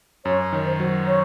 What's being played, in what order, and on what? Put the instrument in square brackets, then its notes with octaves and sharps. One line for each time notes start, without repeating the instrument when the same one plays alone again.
[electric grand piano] F#2 [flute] C#5
[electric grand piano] D#3
[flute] C5
[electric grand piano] F#3
[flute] C#5